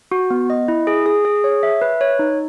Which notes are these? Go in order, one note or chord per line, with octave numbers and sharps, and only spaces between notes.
F#4
B3
D#5
E4
G#4
G#4
G#4
C#5
E5
B4
C#5
D#4